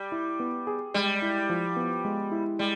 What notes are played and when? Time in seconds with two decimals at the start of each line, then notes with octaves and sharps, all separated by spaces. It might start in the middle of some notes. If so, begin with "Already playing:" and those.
Already playing: G3
0.12 E4
0.40 B3
0.67 G#4
0.94 G3 G#3
1.22 E4
1.49 F3
1.76 B3
2.05 G#3
2.32 E4
2.59 G3 G#3